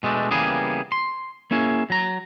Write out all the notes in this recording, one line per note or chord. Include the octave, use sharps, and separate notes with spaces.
B2 G#3 A3 D4
C#3 E3 G3 A#3 B3 G#4
C6
A#3 C#4 E4 G#4
F#3 A#5